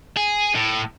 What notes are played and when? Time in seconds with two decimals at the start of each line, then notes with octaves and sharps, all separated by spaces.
0.17 G#4
0.55 A2